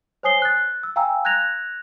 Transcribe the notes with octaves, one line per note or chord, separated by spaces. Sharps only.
C5 C#5 G#5 D#6 C7 G7
F#6 A6
E6
F5 G5 G#5 A#5 E6
F#6 G#6 A#6 F7